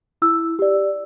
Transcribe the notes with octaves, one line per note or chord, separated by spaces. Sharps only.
E4 E6
G4 D5